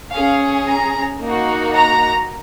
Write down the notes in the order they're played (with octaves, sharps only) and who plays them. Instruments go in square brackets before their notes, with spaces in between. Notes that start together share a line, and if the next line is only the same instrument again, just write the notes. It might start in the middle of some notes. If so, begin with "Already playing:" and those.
[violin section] C#4 G#4 F5
A#5
A#3 D#4 F#4
A#5